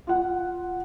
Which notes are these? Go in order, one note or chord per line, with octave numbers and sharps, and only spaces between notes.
F4 F#5